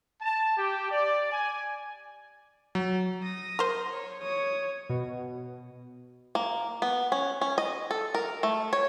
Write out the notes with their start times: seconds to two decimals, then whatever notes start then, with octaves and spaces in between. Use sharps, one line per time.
0.22 A5
0.57 G4
0.91 D5
1.32 G#5
2.75 F#3
3.23 D#6 A#6
3.59 A#4 C5
3.90 C#5
4.22 C#5 D#6
4.89 B2
6.35 A#3
6.82 B3
7.12 C#4
7.41 C#4
7.58 D#5
7.91 A4
8.15 A#4
8.43 A3
8.73 C#5